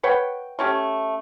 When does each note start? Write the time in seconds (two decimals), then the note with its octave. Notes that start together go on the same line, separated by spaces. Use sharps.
0.03 B4 C#5 F#5 G5
0.59 A3 C#4 G4